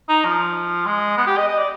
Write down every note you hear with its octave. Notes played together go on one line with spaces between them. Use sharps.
D#4
F3
G#3
B3
G4
D#5
D#5
D5